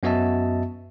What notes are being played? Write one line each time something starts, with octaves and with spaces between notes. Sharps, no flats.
F#2 B3 F#4 D#5 E5 A5